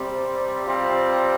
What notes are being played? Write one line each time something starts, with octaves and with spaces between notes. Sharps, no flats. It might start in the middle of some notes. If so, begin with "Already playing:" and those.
Already playing: C3 G3 C4 G4
C3 G3 C4 F4